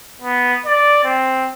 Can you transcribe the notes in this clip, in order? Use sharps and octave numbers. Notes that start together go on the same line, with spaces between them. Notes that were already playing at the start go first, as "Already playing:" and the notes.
B3
D5
C4